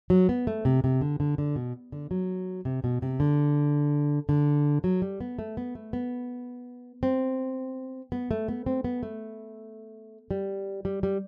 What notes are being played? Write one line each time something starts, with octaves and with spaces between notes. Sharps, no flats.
F#3
B3
A3
C3
C3
D3
D3
D3
B2
D3
F#3
C3
B2
C3
D3
D3
F#3
G3
B3
A3
B3
A3
B3
C4
B3
A3
B3
C4
B3
A3
G3
G3
G3